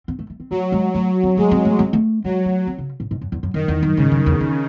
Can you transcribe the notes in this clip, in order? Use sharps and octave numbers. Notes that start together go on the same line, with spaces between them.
C4
A3
A3
C4
F#3 A3
G#3
F#3 A3
C4
G#3 A3
C4
A3
C4
A3
F#3 G#3
A3
C4
C#3
A2
G#2
F#2
E2
F#2
F#2 D#3
E2
F#2
G#2 C#3
F#2
E2
E2